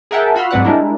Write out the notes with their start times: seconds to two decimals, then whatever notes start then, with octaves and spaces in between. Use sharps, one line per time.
0.11 G#4 A#4 E5 F#5 G5 A5
0.35 F4 F#4 B5 C6 E6 F6
0.51 G#2 F#3 C4 B4 D5 F#5
0.64 G3 G#3 D4 E4 A#4